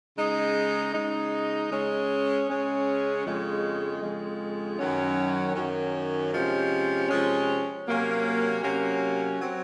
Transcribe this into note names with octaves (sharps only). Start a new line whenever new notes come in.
C#3 G#3 D#4
C#3 G#3 D#4
C#3 G#3 C#4
C#3 G#3 C#4
F2 C#3 G#3
F2 C#3 G#3
F#2 D#3 F#3 C#4
F#2 D#3 F#3 C#4
C3 F3 G#3 C#4
C3 F3 G#3 C#4
C3 F#3 A#3 C#4
C3 F#3 A#3 C#4
F#3 C4